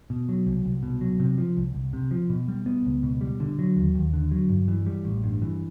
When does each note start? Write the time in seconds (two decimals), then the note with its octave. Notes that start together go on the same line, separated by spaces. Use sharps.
0.10 B2
0.29 F#3
0.47 C2
0.65 C2
0.83 B2
1.01 F#3
1.20 C3
1.38 F3
1.57 C2
1.75 C2
1.93 C3
2.11 F3
2.30 B2
2.48 G3
2.66 B3
2.85 C#2
3.03 B2
3.21 G3
3.40 D3
3.59 F#3
3.76 D#2
3.95 D#2
4.13 D3
4.31 F#3
4.49 G2
4.68 E3
4.86 G3
5.05 A1
5.24 G2
5.42 E3